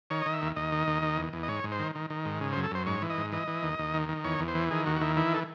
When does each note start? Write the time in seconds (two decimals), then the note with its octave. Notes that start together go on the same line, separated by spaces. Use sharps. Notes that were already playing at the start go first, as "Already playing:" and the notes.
0.10 D#3 C#5
0.22 D#3 D#5
0.34 E5
0.42 D#2
0.56 D#2 D#5
0.72 D#3
0.88 D#2
1.02 D#3
1.18 E2
1.33 E2
1.43 D#5
1.48 G#2 C#5
1.64 G#2
1.72 C5
1.79 D#3
1.95 D#3
2.10 D#3
2.25 G#2
2.41 C#3
2.52 C5
2.56 F#2
2.64 A4
2.71 F#2 C5
2.86 G#2 C#5
3.02 E3
3.10 D#5
3.18 G#2
3.32 E3 D#5
3.47 E3
3.63 D#2
3.79 D#2
3.94 D#3
4.09 D#3
4.24 E2 C#5
4.39 E2
4.48 C5
4.55 E3
4.71 D#3 G#4
4.86 D#2 F#4
4.96 F#4
5.01 D#3 E4
5.17 E3 E4
5.34 A4